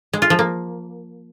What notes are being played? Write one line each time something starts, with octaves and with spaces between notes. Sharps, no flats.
G#3
F4
F3
A#3